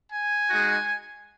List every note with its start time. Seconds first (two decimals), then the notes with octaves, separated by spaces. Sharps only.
0.11 G#5
0.50 G#3 D#4 F#4